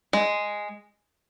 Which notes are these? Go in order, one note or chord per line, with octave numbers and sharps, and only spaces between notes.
G#3